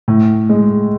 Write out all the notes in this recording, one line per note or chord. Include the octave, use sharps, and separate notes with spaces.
A2
G#3